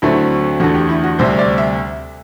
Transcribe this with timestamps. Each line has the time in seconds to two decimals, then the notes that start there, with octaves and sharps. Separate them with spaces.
0.02 D2 D3 F#3 A3 C4 E4
0.60 E2 D3 A3 F#4
0.75 G4
0.89 E4
1.04 F#4
1.19 D2 C3 G3 C4 C5
1.39 D5
1.58 E5